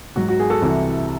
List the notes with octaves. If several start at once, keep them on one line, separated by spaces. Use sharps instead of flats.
G#2 F#3 F#4
F#4
G#4
F#4 A4
C2 C3 E3